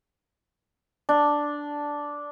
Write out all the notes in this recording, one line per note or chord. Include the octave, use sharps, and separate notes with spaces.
D4